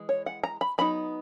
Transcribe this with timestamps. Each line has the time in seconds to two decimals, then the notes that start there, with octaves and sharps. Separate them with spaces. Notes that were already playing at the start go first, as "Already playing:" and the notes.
Already playing: E3 G#3
0.09 C#5
0.26 F#5
0.44 A#5
0.61 B5
0.78 F#3 B3 D#4 B5